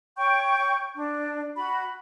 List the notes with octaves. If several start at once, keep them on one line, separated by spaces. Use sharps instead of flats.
C#5 G5 C#6 G6
D4
F#4 B5